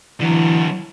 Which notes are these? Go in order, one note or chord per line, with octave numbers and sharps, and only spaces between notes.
D3 E3 F#3